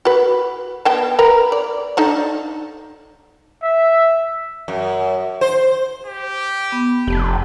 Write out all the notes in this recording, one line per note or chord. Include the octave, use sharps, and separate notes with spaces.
F#4 B4
B3 G5 A5
A#4 B4 A#5
D5
D4 D#4 A4
E5
F#2
C5
G4
B3
F1 G4 A5